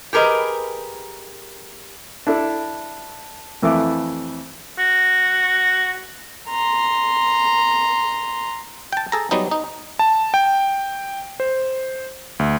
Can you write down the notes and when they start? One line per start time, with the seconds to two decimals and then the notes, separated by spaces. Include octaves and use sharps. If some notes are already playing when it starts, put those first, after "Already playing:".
0.13 G4 G#4 A#4 B4 D#5
2.27 D4 E4 A4
3.62 F2 E3 A3 E4 D6
4.79 F#4
6.49 A#5 C6
8.93 G5 A5
9.12 G#4 A4 A#5
9.31 F#3 G3 B3 D#4
9.51 D#4
9.99 A5
10.34 G5
11.40 C5
12.39 D2